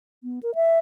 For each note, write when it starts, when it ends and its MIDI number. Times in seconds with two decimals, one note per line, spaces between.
0.24 0.39 59
0.43 0.55 70
0.55 0.79 76